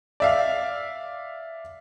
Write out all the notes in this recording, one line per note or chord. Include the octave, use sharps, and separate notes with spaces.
D5 E5 F5